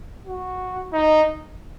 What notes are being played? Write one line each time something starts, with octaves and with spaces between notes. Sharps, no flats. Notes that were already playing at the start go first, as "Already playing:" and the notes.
F#4
D#4